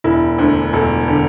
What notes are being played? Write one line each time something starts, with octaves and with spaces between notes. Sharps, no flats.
E1 E4
D2 D3
E1 A4
D3